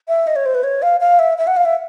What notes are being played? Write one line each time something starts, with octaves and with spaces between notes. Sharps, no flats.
E5
D#5
C#5
C5
B4
C#5
F5
F5
E5
E5
F#5
F5
E5